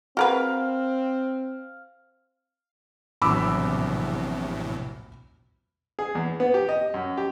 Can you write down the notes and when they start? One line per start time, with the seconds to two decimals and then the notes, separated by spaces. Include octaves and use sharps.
0.17 C4 F#4 A#4 B4 F5
3.22 A#1 E2 A2 C3 F#3 B5 D6 E6
5.99 G#4
6.15 E2
6.40 B3
6.54 G4
6.69 D#5
6.94 F#2
7.18 G4